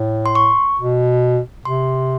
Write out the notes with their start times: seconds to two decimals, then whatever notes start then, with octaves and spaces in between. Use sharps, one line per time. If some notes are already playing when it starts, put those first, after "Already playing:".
Already playing: A2
0.26 C6
0.35 C#6
0.79 B2
1.65 C3 C6